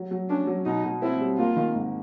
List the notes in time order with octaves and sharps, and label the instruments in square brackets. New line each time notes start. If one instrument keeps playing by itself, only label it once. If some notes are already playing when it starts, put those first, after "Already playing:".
Already playing: [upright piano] F#3
F#3
[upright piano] C#4 [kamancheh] D4
[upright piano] F#3
[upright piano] B2 [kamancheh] D#4
[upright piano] B2
[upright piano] C4 [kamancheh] E4
[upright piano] G3
[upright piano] A#3 [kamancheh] F4
[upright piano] D#3
G#2